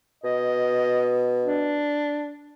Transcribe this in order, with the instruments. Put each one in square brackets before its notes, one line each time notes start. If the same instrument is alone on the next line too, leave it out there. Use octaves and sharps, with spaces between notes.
[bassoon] B2 [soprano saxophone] D#5
[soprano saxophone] D4